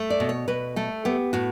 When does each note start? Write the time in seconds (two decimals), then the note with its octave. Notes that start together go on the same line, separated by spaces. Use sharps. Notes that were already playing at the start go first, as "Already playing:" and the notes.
Already playing: A3
0.10 D5
0.20 B2
0.29 C#5
0.48 B2 B4
0.76 A3 A4
1.05 B3 G4
1.33 A2 F#4